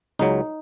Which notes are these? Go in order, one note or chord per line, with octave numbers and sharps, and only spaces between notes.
C#2 C#3 F#3 D#4